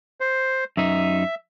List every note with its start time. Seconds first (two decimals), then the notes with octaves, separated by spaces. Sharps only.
0.21 C5
0.77 F#2 D#4 E5